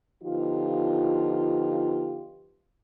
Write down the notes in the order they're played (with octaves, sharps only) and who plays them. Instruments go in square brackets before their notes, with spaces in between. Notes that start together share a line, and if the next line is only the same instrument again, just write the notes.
[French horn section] D3 F3 B3 D#4 F4 G4